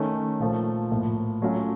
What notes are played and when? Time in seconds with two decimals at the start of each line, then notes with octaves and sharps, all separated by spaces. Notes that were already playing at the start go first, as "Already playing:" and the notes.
Already playing: D#3 A3 C#4
0.40 A#2 F3 A3
0.91 A2 F3 A#3
1.42 F#3 A3 C#4 F4